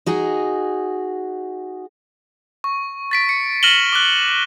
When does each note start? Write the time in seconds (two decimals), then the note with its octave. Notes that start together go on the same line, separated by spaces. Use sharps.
0.06 D#4 F#4 G#4
2.64 C#6
3.11 A6 B6 D7
3.29 C#7
3.63 F6 A#6 D#7 E7 F#7 G7
3.93 D6 F#6